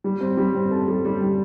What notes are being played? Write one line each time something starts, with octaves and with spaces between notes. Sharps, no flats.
G3
C4
G3
C4
A4
G3
G3
G3